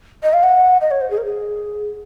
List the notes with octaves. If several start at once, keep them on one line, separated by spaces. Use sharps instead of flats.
D#5
F5
F#5
D#5
C#5
C5
G#4
A#4
G#4